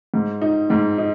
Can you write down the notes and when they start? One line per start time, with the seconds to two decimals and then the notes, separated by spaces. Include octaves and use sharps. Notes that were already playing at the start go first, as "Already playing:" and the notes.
0.14 G#2
0.41 D#4
0.70 G#2
0.98 D#4